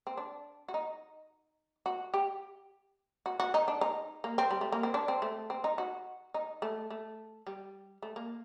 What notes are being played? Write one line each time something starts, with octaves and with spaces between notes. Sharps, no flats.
C4
D4
F#4
D#4
F#4
G4
F#4
F#4
D#4
D4
D#4
A#3
C4
G3
A3
A#3
C4
D4
C4
A3
C4
D#4
F#4
D#4
A3
A3
G3
A3
A#3